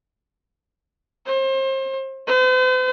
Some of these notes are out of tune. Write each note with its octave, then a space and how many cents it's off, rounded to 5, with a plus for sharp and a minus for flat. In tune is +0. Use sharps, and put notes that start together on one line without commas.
C5 +35
C5 -45